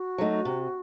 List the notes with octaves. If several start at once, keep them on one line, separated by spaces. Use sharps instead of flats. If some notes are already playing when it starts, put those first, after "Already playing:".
Already playing: F#4
F#3 A3 D#4
C3